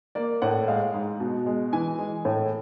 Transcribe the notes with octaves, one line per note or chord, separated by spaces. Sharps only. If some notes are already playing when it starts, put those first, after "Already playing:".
A#3 D5
A2 F#5
G#3 F5
G#2
B2
G#3
E3 G#5
G#3
A2